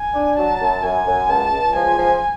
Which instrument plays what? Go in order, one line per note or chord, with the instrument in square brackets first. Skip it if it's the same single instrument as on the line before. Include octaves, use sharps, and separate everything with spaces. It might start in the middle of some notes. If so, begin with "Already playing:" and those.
Already playing: [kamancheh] G#5
[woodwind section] D4
[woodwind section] F#3 [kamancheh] A5
[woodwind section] F#2
[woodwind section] F#2 [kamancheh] G#5
[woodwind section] F#2
[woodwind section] C#2 [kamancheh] A5
[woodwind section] C#2
[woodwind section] F3 [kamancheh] G#5
[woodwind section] F3